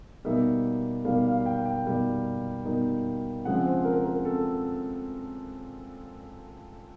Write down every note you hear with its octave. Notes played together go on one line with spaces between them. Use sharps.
B2 G3 A#3 D#4 E5
B2 G3 A#3 D#4 F5
F5
G5
G5
B2 G3 A#3 D#4
B2 G3 A#3 D#4
C#3 F3 G#3 C4 F#5
C5
A#4
A#4
C4 A4